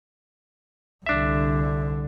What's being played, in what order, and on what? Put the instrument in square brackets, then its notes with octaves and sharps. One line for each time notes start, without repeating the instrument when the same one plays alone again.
[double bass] C2 D3 [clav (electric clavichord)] D4 E5